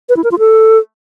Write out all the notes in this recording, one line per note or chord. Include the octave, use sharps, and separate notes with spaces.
B4
E4
A#4
F4
A4